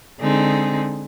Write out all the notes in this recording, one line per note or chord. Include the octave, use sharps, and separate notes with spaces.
D3 G#3 C4 D#4 G#4